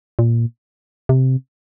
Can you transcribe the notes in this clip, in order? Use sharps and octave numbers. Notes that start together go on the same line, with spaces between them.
A#2
C3